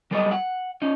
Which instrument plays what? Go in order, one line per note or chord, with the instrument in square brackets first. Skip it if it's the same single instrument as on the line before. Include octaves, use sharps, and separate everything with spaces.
[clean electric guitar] F#3 G3 A4 B4 D5 D#5
F#5
C#4 D#4